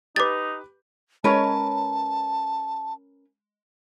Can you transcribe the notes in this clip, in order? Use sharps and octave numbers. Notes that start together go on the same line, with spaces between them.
D#4 G4 B4 D6 A6
G#3 C#4 A#4 B4 C#5 A5